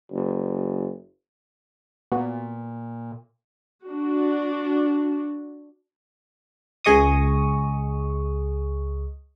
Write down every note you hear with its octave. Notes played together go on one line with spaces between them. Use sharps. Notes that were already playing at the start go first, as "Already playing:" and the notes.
F#1
A#2 B3 F#4
D4 F#4
C#2 G#4 D#5 C#6 D#6